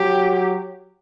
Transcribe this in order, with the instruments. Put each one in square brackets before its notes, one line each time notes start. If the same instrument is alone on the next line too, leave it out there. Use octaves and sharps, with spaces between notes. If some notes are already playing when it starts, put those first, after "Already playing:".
Already playing: [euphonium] F#3 [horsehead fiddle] G4